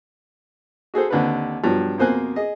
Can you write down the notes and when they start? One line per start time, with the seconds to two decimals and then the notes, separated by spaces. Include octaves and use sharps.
0.94 F#4 G#4 A4 C5
1.10 D#2 D3 C4 B4
1.64 G2 B2 F3 F#3
1.98 F2 B2 A#3 C5 G#5 F#6
2.36 G#4 D#5